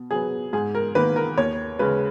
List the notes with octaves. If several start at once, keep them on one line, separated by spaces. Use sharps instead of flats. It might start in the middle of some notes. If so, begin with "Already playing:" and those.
Already playing: B2
F#3 B3 G#4
G#2 G#4
A#4
D#3 A#3 B4
A#4
D#2 C#5
C#3 G#3 B4